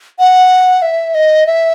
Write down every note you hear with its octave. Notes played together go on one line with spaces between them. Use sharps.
F#5
E5
D#5
E5